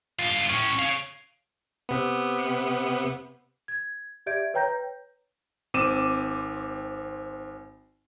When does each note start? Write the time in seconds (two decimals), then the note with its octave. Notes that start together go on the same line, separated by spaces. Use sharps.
0.19 G2 F4
0.50 A2 C#4
0.79 C#5 F5
1.89 C3 B3
3.68 G#6
4.26 G4 D5 E5 G6 G#6 D7
4.54 B4 C#5 G5 A#5 G6 A#6
5.74 G#1 C4 D6 D#7 E7